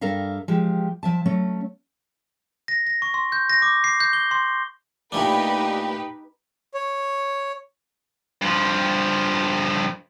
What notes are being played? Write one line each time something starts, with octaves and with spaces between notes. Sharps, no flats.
G2 A4 A#4 E5 F5
F3 G#3 G4
F3 E5 A5
F#3 A3 C#4
A#6
A#6
C#6
C6
G6
A#6
D6
C7
G6
G7
C6
A#2 A3 D4 D#4 G4 B4
C#5
G2 F3